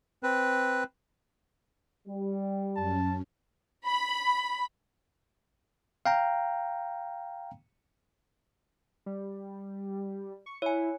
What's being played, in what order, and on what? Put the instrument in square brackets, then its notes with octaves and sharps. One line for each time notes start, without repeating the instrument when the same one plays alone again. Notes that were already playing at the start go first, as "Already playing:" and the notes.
[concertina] C4 B4
[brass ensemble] G3
[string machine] F#2 C#4 [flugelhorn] A5
[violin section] B5
[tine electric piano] F5 G5 A#5
[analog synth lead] G3
C#6
[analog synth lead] E4 [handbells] C#5 G#5